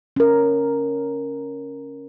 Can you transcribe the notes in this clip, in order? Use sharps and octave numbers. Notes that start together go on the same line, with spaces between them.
C#4 A#4